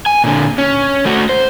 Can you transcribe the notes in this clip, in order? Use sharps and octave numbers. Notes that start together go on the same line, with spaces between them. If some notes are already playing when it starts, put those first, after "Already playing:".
G#5
A#2 D3
C#4
A3 F#4
C5